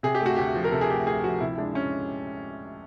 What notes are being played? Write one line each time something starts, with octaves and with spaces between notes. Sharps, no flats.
C3 G#4
G4
A3
F#4
D2 G4
F3
A#4
C3 A4
G#4
A3 G4
D2 G#4
F3 F#4
C3 E4
G#3 D4
C#4